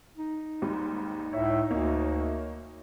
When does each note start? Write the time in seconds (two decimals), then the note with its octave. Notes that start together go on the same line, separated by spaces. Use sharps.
0.16 D#4
0.62 D#2 G#2 G3
1.33 C#2 A2 C#5 E5
1.71 D2 A#3 C#5 D#5